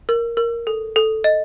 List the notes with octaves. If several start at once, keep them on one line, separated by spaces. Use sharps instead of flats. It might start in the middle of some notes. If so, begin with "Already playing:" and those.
A#4
A#4
A4
A4
D#5